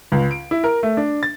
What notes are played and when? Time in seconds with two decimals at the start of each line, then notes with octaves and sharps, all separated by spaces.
0.12 C#2
0.31 D7
0.51 E4
0.64 A#4
0.83 A3
0.97 D4
1.23 A6